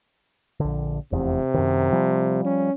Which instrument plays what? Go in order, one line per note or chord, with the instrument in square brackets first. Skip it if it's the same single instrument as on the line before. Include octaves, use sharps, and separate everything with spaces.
[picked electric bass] A#1 D3
[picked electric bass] F1 E2 [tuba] C3
[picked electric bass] F#2 D#3
F3 G3
[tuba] C#4